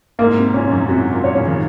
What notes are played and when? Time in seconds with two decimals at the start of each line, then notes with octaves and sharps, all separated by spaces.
0.19 G#2 A#3
0.37 C3
0.54 A#2 C#4
0.71 F#2
0.88 C3 F#4
1.13 A#2
1.24 C#5
1.36 C#3
1.46 D#3